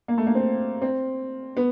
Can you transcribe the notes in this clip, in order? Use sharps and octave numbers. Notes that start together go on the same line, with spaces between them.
A#3
A3
A#3
C4
C4
B3